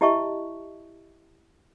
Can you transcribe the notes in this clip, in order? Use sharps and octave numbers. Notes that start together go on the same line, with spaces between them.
E4 G4 D#5 E5 A5 C#6